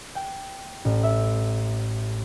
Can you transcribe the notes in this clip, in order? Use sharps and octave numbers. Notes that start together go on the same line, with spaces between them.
G5
A1
E5